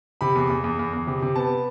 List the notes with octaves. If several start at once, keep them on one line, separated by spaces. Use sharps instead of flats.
C3 B5
E2
E2
E2
E2
E2
C3
C3
B3 A5